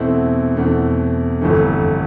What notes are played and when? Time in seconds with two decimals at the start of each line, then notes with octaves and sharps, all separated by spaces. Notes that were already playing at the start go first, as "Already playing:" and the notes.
Already playing: E2 B2 A3 C4 E4
0.56 E2 B2 A3 C4 E4
1.41 G1 F2 E3 A3